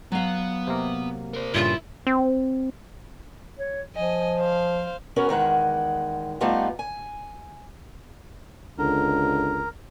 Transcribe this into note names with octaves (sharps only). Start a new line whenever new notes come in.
F#3 B3 F5
C3 A#3
A#4 C5
G2 A#2 C#3 E4 F4
C4
C#5
F3 D#5 G#5
C5 F5
B3 C#4 F#4 G#4 A#4 B4
E2 D#3 G#3 F#5
G3 A3 B3 D#4 F4 G4
G#5
C#2 D3 A#4